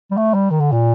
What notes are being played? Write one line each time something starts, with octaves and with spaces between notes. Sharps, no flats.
G3
A3
G3
D#3
D3
A#2